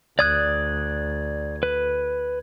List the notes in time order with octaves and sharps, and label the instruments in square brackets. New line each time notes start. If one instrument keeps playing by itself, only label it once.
[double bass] D2 [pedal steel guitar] D5 D#6 F#6 [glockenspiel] G#6
[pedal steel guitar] B4